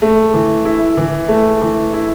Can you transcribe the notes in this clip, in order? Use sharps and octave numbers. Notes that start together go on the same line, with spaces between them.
A3
E3
E4
E3
A3
E3
E4